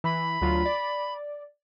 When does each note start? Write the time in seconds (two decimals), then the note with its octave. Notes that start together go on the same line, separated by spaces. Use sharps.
0.04 E3 B5
0.42 D2 F#3 F4
0.66 D5